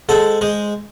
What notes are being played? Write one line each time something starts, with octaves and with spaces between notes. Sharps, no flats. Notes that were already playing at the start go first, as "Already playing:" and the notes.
G#3 A4 C5 F#5 A5
G#3 C5 D#5